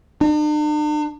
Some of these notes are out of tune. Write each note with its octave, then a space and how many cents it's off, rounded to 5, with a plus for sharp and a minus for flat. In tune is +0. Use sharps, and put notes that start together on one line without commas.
D4 +45